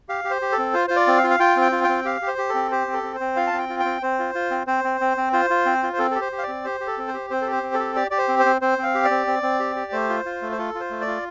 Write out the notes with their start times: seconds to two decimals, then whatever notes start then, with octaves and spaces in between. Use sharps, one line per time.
0.09 G4 F5
0.25 G4
0.31 C5
0.42 G4
0.52 A4
0.58 C4
0.73 F4 C5
0.88 F4 C5
0.96 D5
1.07 C4
1.17 F5
1.24 F4
1.30 F5
1.40 F4 G5
1.56 C4
1.61 G5
1.72 F4
1.84 C4 G5
2.05 G4 F5
2.22 G4
2.27 C5
2.38 G4
2.49 A4
2.54 C4
2.71 G4 C5
2.87 C4
2.93 A4
3.03 C4
3.15 C5
3.20 C4
3.36 F4 F5
3.47 A5
3.53 C4 G5
3.69 F4
3.80 G5
3.85 C4
4.03 C4 C5
4.19 F4
4.35 F4
4.51 C4
4.67 C4 C5
4.84 C4
5.01 C4
5.17 C4
5.33 F4 C5
5.50 F4
5.66 C4
5.83 F4
5.93 C5
5.99 C4 A4
6.11 G4 A4
6.21 C5
6.32 G4
6.38 F5
6.43 C4 D5
6.64 G4 C5
6.80 G4
6.87 A4
6.98 C4
7.08 C5
7.14 G4
7.30 C4 C5
7.41 G4 A4
7.52 C5
7.63 C4
7.74 A4
7.80 G4
7.96 G4 D5
8.11 G4 D5
8.18 C5
8.29 C4
8.39 C5
8.46 C4
8.61 C4 C5
8.78 C4 F5
8.95 G4
9.05 D5
9.10 C4
9.27 C4
9.43 C4
9.60 G4
9.76 G4
9.92 A3 C5
10.09 F4
10.25 F4
10.42 A3
10.52 C5
10.58 F4 A4
10.75 F4
10.80 C5
10.90 A3
11.01 D5
11.07 F4